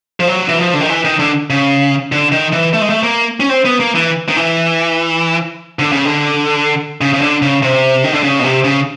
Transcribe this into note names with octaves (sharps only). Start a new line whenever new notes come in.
F3
F#3
E3
F3
D3
D#3
E3
D#3
D3
C#3
D3
D#3
E3
A3
G#3
A3
A#3
C#4
C4
B3
A#3
E3
D#3
E3
D3
C#3
D3
C#3
C#3
D3
C#3
C3
D#3
D3
C#3
B2
C3
C#3